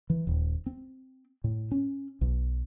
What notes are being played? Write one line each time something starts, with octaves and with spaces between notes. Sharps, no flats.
E3
D#1
C4
A2
C#4
B1